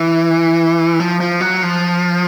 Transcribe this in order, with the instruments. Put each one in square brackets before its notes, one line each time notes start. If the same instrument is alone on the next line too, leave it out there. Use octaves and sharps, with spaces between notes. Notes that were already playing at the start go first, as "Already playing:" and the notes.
Already playing: [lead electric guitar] E3
F3
F3
F#3
F3